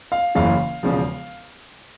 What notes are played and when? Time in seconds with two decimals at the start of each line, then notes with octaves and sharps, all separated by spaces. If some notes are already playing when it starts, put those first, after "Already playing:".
0.12 F5
0.35 F#1 F#2 C#3 E3 F5
0.83 E1 E2 C#3 F3